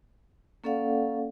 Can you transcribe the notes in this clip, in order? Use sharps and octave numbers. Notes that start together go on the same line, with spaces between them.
A#3 C#4 A4 D5 F5 F#5